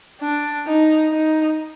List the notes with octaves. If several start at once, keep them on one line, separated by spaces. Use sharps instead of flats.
D4
D#4
D#4